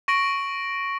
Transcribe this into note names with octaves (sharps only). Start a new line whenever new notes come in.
C#6 A#6 D7 F#7